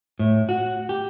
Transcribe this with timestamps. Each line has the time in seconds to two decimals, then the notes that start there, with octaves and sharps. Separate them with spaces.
0.19 A2
0.49 F#4
0.89 G4